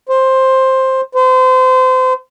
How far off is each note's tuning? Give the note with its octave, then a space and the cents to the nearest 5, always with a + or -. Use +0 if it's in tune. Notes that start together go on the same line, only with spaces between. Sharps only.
C5 +10
C5 -30